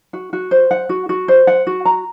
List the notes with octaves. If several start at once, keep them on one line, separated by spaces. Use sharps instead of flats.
F#4
F#4
C5
F#5
F#4
F#4
C5
F#5
F#4
A#5